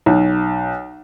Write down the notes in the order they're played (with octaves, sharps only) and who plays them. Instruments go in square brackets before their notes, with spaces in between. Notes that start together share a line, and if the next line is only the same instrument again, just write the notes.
[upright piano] B1